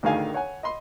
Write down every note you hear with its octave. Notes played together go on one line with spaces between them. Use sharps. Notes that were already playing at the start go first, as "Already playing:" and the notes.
D2 A2 D#3 G#4 F5 G#5
C#5 F#5 G#5
D#5 B5 C6